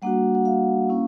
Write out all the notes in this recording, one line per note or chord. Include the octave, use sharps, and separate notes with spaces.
G3 A#3 D4 F#4 F#5
F#5
F5
A#3 C#4 E4